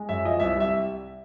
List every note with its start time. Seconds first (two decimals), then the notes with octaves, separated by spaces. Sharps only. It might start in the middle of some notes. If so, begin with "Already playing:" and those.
Already playing: G#3
0.09 F#2 E5
0.25 F3 D#5
0.40 C2 E5
0.56 G3 E5